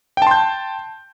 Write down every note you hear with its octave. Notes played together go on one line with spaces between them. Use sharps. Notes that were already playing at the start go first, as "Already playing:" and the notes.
G5 A5 C6 G6